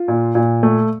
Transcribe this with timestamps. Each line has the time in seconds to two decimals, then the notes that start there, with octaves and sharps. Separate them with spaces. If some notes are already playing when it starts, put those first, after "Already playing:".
Already playing: F4
0.08 A#2
0.35 A#2
0.63 A3